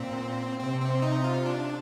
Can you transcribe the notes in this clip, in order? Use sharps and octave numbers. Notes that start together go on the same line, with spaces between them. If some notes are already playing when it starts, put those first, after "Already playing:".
Already playing: A#2 C4
C3 C4
C4
D#4
F4
D4